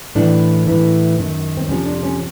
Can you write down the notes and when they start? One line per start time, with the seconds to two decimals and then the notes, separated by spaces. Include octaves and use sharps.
0.15 A2 E3 D4
0.67 A2 E3
1.18 F#2 D#3
1.57 C4
1.69 F2 C3 F3 C#4
1.86 D4
2.03 C#4